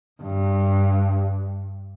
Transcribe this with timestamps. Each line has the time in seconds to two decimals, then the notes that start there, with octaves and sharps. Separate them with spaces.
0.22 G2